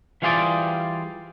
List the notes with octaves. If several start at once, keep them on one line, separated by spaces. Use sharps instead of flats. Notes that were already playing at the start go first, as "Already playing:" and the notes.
E3 G3 F4 G#4 C5 D5